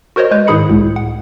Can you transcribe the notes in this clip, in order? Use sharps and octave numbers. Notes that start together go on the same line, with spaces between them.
F#4 A#4 C5 C#5 D#5
G#3 B4 G6
G#2 D#3 E4 G#4 B5 C#7
C#2 A2
F#5